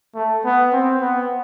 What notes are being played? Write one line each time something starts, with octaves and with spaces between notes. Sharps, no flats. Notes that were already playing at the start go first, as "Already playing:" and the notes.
A3
B3
C4
B3